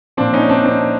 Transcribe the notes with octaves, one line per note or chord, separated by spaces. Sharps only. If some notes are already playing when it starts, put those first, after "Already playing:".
A#2 F3 C4 D4
C#4 D#4
C4 D4
C4 D4